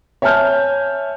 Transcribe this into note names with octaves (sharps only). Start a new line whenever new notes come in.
C#5 E5 G#5 A5 F6 G6